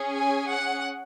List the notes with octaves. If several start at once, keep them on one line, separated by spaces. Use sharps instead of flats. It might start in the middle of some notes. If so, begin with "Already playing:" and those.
Already playing: C#4 G#4
G#5
F#5